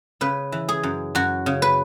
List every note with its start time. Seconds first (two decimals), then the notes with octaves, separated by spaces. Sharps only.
0.21 C#3 B4
0.52 E3
0.69 G#4
0.83 F#2
1.15 F#2 F#4
1.46 C#3
1.62 B4